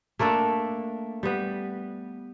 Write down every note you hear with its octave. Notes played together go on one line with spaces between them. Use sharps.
A3 A#3 D4 A4
G3 B3